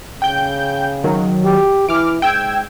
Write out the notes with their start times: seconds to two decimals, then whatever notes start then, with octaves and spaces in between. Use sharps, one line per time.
0.22 C#3 G5 G6
1.04 D#3 F#3
1.44 G4
1.89 E3 D6 F6
2.22 G#2 G5 E6 G#6